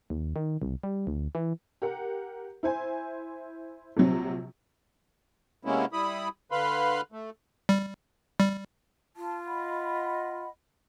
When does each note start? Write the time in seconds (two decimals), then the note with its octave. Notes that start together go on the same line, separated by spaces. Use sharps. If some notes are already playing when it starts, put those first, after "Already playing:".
0.10 D#2
0.36 D#3
0.62 C2
0.83 G3
1.07 D2
1.35 E3
1.82 G4 A#4 F#5
2.63 E4 C5 G#5
3.97 A#1 C3 F#3 C4
5.65 C3 G#3 A#3 B3 C#4 E4
5.93 G3 E4 B5 D#6
6.52 D3 B4 F5 B5 C6
7.12 A3
7.69 G3
8.40 G3
9.17 F4 A5
9.46 D#5 F#5 B5